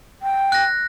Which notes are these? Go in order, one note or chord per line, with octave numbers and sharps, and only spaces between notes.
G5
F#6 A#6